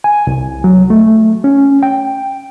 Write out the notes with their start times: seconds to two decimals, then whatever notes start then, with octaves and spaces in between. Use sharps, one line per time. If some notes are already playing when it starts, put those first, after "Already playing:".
0.04 G#5
0.27 C2
0.64 F#3
0.90 A3
1.44 C#4
1.83 G5